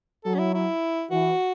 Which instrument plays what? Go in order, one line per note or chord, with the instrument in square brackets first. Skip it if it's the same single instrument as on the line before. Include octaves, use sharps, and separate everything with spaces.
[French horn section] F#3 [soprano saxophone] A4
[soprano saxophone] C#4
E4
E4
[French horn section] E3 [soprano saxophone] F#4